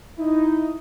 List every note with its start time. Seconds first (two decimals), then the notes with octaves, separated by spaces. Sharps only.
0.18 D#4 E4